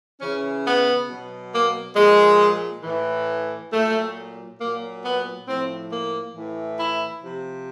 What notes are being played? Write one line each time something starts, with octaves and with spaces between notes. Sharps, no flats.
C#3 E3 C#4
B3
B2 F#3
A#3
A#2 F3 G#3
A2 E3
A#2 F#3 A3
A#2 F#3 A#3
B3
A2 F3 C4
A#3
A2 E3
E4
C3 F3